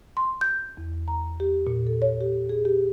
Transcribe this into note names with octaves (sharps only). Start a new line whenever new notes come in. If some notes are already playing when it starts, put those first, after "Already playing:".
C6
G6
E2
A#5
G4
A#2
A4
C#5
G4
G#4
G4